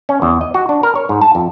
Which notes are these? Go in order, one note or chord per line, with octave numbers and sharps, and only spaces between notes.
C#4
E2
D#5
F#4
D4
A#4
C#5
G#2
A5
F2